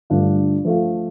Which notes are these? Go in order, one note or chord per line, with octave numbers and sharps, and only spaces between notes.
G2 D3 A3 D4 F4
F3 A3 F4